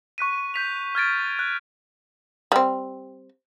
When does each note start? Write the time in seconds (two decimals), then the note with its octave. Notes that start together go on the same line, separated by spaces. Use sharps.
0.18 C#6 F#6 B6 D#7
0.54 G6 B6 F7
0.95 F6 G#6 A6 D7
1.39 F#6
2.52 G3 C4